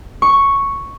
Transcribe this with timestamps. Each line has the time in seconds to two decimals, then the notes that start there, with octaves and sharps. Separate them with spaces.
0.22 C#6